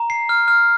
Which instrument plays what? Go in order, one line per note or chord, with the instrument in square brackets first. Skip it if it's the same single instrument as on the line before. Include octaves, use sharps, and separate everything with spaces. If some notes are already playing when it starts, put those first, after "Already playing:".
Already playing: [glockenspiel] A#5
C7
F6
F6